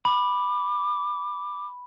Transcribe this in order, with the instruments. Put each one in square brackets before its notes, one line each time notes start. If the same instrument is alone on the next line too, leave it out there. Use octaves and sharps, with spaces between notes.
[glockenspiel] B5 [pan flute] D6